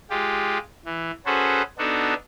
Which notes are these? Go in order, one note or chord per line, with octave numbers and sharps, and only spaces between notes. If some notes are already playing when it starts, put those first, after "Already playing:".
G#3 F4 G4
E3
C#4 F#4 G#4 A4 B4 C5
B3 D4 D#4 F#4 A4